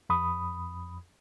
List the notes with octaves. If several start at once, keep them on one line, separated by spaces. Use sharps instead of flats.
F2 B5 D#6